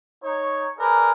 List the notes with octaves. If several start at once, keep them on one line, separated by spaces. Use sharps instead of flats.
D#4 C#5
G#4 A#4 B4 D5